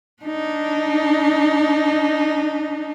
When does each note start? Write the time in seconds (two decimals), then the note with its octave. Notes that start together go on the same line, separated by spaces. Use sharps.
0.22 D4 D#4